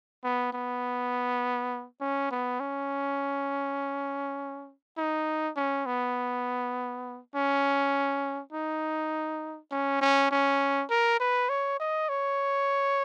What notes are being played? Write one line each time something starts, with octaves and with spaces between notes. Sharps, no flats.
B3
B3
C#4
B3
C#4
D#4
C#4
B3
C#4
D#4
C#4
C#4
C#4
A#4
B4
C#5
D#5
C#5